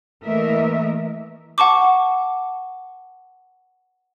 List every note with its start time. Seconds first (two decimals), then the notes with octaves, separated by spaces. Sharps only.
0.24 E3 A3 A#3 A#4 D#5 E5
1.58 F#5 A5 C#6 D6